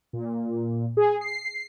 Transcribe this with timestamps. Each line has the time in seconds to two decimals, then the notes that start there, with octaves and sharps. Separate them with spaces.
0.13 A#2
0.97 G#4
1.21 C7